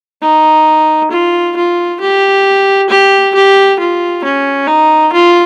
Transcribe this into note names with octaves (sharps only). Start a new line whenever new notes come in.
D#4
F4
F4
G4
G4
G4
F4
C#4
D#4
F4